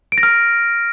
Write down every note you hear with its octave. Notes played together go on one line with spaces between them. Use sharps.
D7
A#6
F6